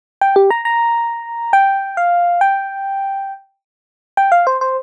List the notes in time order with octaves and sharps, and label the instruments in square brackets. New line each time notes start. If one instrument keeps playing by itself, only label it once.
[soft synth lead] G5
G4
A#5
A#5
G5
F5
G5
G5
F5
C5
C5